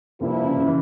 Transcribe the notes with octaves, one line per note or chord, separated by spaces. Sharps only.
G2 C3 F3 A#3 E4
C#3
C#3
E3